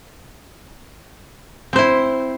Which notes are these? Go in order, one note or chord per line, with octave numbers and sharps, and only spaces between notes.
C4 E4 C5